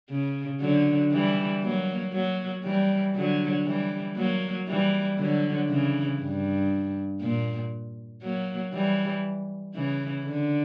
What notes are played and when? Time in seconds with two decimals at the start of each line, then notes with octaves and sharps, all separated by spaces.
0.10 C#3
0.61 D3 F#3
1.12 E3 G3
1.63 F#3 A#3
2.13 F#3 A#3
2.64 E3 G3
3.15 D3 F#3
3.65 E3 G3
4.17 F#3 A#3
4.68 E3 G3
5.19 D3 F#3
5.69 C#3 E3
6.20 G2
7.21 A#2
8.23 F#3 A#3
8.74 E3 G3
9.75 C#3 E3
10.26 D3